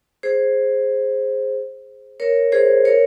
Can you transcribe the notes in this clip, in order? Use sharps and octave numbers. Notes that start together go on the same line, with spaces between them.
G#4 C5
A#4 C#5
G#4 C5
A#4 C#5